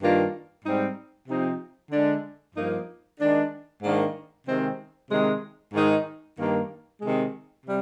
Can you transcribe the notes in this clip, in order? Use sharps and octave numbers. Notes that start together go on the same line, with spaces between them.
G2 D#3 A#3 D4 F4
G#2 G3 C4 D#4
C3 F3 C4 D#4
D3 G#3 D4
G2 F3 A#3 D#4
D#3 G#3 D4
G#2 D#3 A#3 D4
C3 D#3 G#3 C4
C3 D#3 G#3
G#2 D#3 G#3 D#4
G2 D#3 A#3
C3 D#3 G#3
C3 G3